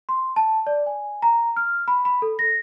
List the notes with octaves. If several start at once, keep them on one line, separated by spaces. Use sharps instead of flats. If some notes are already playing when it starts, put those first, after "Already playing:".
C6
A5
D5
G#5
A#5
F6
B5
B5
A4
A#6